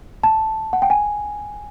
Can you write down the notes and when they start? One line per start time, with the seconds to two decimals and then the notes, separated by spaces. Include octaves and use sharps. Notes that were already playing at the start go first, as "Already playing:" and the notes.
0.23 A5
0.73 F#5
0.82 G5
0.90 G#5